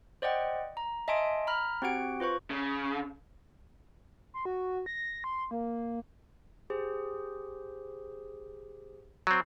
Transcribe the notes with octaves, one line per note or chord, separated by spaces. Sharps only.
C5 D5 D#5 F#5 G5
A#5
D#5 E5 G#5 A5 C6 D7
A#5 B5 F6
C4 F#4 G4 F#5 D7
F4 B4 C5 C#6
C#3
C6
F#4
A#6
C6
A#3
G4 G#4 C5
F#3 C4